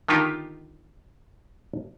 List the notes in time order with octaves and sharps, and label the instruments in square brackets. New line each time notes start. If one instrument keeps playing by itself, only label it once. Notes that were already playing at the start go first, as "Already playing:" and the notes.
[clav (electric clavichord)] D3 D#3 B3 D#4 F4 G4